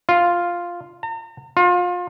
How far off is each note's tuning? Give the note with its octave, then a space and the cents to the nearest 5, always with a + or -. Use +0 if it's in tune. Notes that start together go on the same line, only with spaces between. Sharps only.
F4 +0
A#5 -40
F4 +30